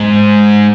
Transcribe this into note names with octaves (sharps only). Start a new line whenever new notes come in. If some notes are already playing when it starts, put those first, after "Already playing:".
Already playing: G#2